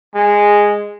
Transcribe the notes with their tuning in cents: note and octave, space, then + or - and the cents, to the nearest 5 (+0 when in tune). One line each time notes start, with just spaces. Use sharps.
G#3 -10